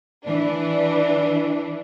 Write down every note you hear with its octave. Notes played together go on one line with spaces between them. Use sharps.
E3 D4